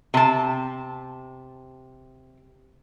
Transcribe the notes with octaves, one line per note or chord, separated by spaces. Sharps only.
C3 A5